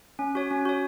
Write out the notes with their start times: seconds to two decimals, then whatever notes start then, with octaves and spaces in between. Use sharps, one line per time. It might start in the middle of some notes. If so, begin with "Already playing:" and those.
0.19 C#4
0.35 F#4 C#5
0.51 C#4
0.65 F#4 C#5